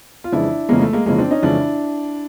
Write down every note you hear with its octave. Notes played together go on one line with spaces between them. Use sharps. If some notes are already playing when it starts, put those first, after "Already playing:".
F4
F2 C#3 E3 G#3 D4 E4
F2 C#3 E3 G#3 A#3
A3
G#3 A#3
F2 C#3 E3 G#3 A#3
C4 D4
C#4 D#4
F2 C#3 E3 G#3 D4 E4